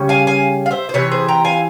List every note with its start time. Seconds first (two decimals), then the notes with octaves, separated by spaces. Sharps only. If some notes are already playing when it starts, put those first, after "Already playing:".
Already playing: C#3 G3 C#4
0.09 F5 G#5
0.27 F5 G#5
0.66 F5
0.71 C5 E5
0.89 C5
0.94 C3 E3 C#5
1.11 G#4 C5
1.28 G5 A#5
1.44 F5 G#5